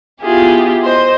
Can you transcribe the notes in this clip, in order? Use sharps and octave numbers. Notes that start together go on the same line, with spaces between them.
B3 E4 F4 G4 G#4
C5 D#5 C6